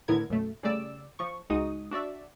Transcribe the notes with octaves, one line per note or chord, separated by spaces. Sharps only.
A2 D3 B3 E4 A#4 G#6
F#2 B2 A3
C#3 G3 A3 D5 E6
F3 C#6
C#2 G#3 D#4 F#4 D#6
D4 F#4 D5 E5